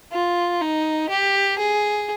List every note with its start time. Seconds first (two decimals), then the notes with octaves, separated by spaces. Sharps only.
0.12 F4
0.61 D#4
1.09 G4
1.59 G#4